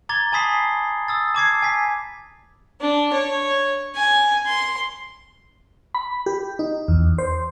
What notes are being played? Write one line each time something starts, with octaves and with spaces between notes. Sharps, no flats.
A#5 D6 G#6 A6 G7
G#5 A5 B5 D#6 B6 C7
D#6 E6 A6
A5 D6 G#6 C7
G#5 B6
D4
C#5
G#5
C6
B5
G4
D#4
E2
C5